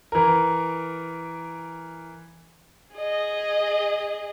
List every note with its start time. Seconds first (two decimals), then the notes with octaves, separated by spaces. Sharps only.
0.12 E3 A#4
2.95 G#4 D#5